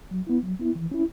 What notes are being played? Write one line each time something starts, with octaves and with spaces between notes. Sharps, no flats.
F#3
B3 E4
F#3
B3 E4
E3
C#4 E4